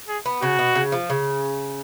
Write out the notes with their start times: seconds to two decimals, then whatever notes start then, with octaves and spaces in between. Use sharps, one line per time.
0.08 G#4
0.26 B3
0.42 C#3 F#4
0.59 B2
0.75 C#3
0.92 F3
1.10 C#3